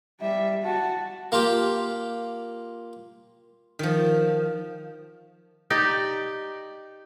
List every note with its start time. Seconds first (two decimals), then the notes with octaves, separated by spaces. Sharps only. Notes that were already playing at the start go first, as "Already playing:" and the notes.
0.20 G3 E5
0.63 F#4 A5
1.32 A#3 F4 G4
3.79 D#3 F3
5.70 D#4 G4 D5